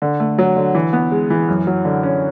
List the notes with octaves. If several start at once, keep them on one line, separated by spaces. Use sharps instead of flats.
D3
A3
F#3
D3
E3
B3
G#3
E3
F#2
F#3
D3
C#4